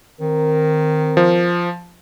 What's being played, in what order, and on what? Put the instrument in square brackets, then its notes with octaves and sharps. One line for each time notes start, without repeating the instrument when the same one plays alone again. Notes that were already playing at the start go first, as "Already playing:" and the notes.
[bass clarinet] D#3 [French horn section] C4 A#4
[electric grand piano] F3